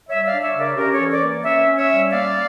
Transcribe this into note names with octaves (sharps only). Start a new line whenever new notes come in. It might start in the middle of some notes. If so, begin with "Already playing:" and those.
G3 C#5 E5
D4 D5 F5
C#5 E5
C#3
A#4 D5
C#4 G4 A#4
A4 C#5
E3
A#4 D5
A#3
C#4 C#5 E5
C#4
C#5 E5
G3
A#3 D5 F5